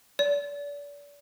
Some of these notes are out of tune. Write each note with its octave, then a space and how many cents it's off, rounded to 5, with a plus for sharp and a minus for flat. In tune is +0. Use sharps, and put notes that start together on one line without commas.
D5 -35